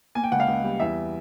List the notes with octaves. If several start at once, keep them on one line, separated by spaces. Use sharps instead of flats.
A#3 G#5
G5
C#2 F#5
F5
C#2
G3
E2 E5